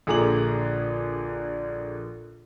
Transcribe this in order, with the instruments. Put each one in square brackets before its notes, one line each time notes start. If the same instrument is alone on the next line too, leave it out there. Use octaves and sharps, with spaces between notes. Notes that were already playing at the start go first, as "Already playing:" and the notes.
[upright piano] A#1 D3 G#4 A#5 D6 F#7